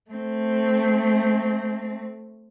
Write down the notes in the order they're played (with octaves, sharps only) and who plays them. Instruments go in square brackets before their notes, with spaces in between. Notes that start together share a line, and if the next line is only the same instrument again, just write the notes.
[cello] A3 C4